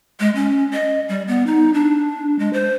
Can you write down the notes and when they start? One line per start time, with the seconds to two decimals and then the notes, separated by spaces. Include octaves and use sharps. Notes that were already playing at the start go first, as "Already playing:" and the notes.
0.20 G#3
0.35 C#4
0.73 D#5
1.09 G3
1.28 B3
1.47 D#4
1.74 D4
2.39 G#3
2.53 C5